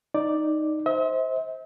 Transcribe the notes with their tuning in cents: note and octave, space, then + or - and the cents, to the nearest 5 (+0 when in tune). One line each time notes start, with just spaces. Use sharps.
D#4 +0 D5 +0
C5 +0 E5 -45